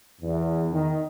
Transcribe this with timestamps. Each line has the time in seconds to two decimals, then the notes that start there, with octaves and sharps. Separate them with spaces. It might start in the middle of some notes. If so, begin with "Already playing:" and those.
0.21 E2
0.71 D#3